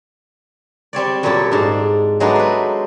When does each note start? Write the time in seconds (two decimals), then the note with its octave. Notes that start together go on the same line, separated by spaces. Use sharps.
0.93 G3 C4 C#5 D5
1.23 F#2 A#2 G3 G4 A4 C#5
1.51 G#2 D4
2.20 F#3 G#3 A3 B3 D4 D#4
2.36 B4 C5